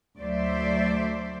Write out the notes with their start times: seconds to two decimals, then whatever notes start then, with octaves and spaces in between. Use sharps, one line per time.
0.18 D2 F#3 C5 D5 E5